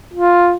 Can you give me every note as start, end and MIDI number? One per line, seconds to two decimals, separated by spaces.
0.14 0.56 65